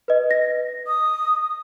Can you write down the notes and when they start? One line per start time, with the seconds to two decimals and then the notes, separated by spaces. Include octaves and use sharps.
0.08 B4 D#5
0.31 A#6
0.87 D#6